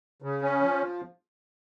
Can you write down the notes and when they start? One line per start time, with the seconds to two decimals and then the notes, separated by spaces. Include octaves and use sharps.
0.22 C#3
0.42 C#4
0.61 F3